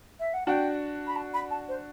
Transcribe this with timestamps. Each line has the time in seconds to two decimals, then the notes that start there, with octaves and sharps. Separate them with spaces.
0.19 E5
0.33 F#5
0.46 D4 F#4 G5
1.07 B5
1.15 A5
1.33 B5
1.50 A5
1.68 C5